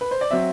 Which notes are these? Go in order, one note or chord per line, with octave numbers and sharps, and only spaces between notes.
B4
C5
D5
F#3 C4 E5